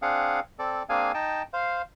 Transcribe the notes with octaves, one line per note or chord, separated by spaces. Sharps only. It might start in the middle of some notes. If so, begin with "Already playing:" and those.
C4 D4 G#4 F5 F#5
C4 A4 D5
A#3 C4 D4 G#4 F5 G#5
D#4 G5 A5
C5 F5